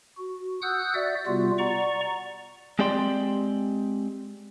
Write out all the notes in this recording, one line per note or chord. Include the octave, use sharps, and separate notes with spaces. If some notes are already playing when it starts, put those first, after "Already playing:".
F#4
F#5 D#6 E6 F#6 G6
F#4 D5 E5
C3 G3 B3 F4 F#4
D5 F#5 A#5 C#6
G#3 C4 G4 D5 G5 C6